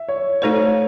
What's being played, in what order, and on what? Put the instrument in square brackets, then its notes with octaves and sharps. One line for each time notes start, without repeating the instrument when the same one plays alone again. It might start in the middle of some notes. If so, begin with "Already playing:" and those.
Already playing: [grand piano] E5
C#5
[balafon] A3 D#4 A4 C5 [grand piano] C#5